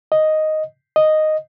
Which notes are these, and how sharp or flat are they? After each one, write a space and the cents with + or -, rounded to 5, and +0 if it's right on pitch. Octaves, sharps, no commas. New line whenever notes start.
D#5 +0
D#5 -5